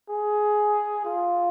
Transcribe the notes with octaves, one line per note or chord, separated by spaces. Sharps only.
G#4
F4